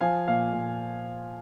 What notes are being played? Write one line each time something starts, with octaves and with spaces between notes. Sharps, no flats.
F3 F5 G#5
A#2 F5
A#2